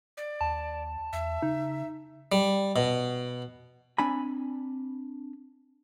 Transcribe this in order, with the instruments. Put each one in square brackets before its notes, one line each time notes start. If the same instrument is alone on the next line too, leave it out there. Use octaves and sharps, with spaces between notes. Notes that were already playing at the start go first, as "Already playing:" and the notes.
[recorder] D5
[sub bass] D#2 [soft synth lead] A5
[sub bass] E2 [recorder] E5
[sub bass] C#3 [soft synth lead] D#4
[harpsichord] G3
B2
[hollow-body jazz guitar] C4 D4 G#5 B5